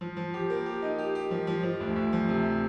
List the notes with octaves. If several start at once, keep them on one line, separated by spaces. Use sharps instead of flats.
F3
F3
G4
A#3
G4
D#4
G4
G4
F3
F3
F3
D2
D2
F3
C3